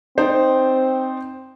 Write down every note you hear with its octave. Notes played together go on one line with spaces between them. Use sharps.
C4 D#4 C5 D5